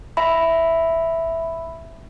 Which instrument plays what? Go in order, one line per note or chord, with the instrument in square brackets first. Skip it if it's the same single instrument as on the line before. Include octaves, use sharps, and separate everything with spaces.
[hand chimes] E5 B5